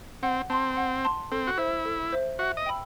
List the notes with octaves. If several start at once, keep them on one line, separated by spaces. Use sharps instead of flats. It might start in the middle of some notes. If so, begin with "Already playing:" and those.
C4 F#5
C4 A5 C6
F#5
A5 C6
C4 A4
F#4
E4 C5 E5
A4
C5 E5
F#4 E5
D#5
G5 B5 E6